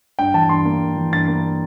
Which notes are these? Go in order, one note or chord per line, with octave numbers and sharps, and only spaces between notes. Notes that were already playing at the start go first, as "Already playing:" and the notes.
G2 G5
E3 A5
G2 C6
A#3
G2
E3
G2 A6
A#3